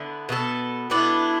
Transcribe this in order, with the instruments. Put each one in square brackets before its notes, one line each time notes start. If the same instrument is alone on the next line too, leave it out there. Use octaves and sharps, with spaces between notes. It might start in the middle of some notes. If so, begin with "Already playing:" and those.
Already playing: [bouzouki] D3 B3 E4
B2 B3 D4 A4
[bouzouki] B2 B3 D4 A4 [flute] E4